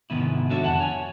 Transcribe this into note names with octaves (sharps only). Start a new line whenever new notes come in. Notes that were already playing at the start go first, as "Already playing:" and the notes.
G#2 C3 D#3 B3 E4
D4 F#4 A4 C#5 E5
F2 D3 F#5 A5
C#5 G#5